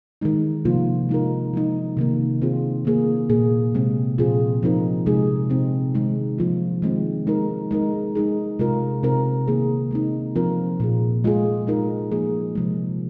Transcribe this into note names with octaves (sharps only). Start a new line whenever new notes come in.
D#3 G#3 D#4
C3 F3 A#3 F4
G#3 D#4 A#4
F3 G#3 D#4
C3 D#3 A#3
D#3 C4 F4 G#4
D#3 A#3 G#4
A#2 A#3 G#4
C3 G#3 C4 G#4
A#2 F3 C4 F4 G#4
F3 C4 D#4 A#4
C3 G#3 D#4 G#4
C3 F3 C4 D#4
D#3 G#3 D#4
F3 A#3 F4
D#3 G#3 C4
G#3 D#4 A#4
G#3 D#4 A#4
G#3 D#4 G#4
C3 G#3 F4 A#4
C3 G#3 C4 D#4 A#4
D#3 A#3 G#4
G#3 C4 D#4
F3 C4 F4 A#4
A#2 A#3 G#4
G#3 F4 G#4
G#3 D#4 A#4
F3 A#3 G#4
C3 F3 G#3